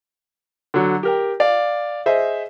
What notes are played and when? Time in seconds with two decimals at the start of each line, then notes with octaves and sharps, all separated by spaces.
0.74 D3 F#3
1.03 G4 A#4 G5
1.40 D5 F5
2.06 G#4 C5 D#5 E5